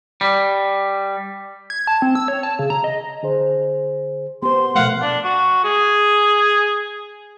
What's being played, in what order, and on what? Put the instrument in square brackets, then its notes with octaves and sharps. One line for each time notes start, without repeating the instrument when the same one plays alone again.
[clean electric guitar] G3
[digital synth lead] G#6
A5
C4
E6
C#5
A5
C#3
A#5
D#5
[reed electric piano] D3 G#4 C5
[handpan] B3 C5 [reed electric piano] G4 [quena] C6
[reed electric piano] C#2 F3 A#4 [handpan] B2 A3 [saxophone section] F5 F#5
[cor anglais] D4
F#4
G#4